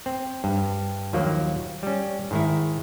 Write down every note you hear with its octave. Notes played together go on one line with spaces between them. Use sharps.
C4
G2
D#2 F3 F#3 A#3
G3 C#4
G#2 D#3 E4